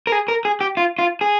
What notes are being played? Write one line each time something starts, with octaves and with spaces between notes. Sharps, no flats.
A#4
G#4
A#4
G#4
G4
F4
F4
G#4